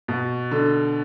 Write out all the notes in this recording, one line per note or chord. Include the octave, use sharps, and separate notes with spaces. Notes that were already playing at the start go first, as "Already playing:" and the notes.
B2
D3